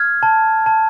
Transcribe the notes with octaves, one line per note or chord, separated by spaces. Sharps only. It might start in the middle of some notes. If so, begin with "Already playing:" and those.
Already playing: F6 G#6
A5
A5